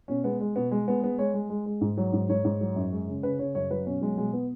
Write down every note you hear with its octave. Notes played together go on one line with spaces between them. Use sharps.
B2 C#4
G#3 B3
G#3
B2 B3
G#3
G#3 B3
G#3 B3
G#3 C#5
G#3
G#3
G#3
G#2
F#3
G#2
G#2 C#5
G#2
F#3
F#2
G#3
C#3
C#3 B4
C#3 C#5
F#2 C#5
F#3 B4
B2 C#4
F#3 G#3
B2 G#3
B2 B3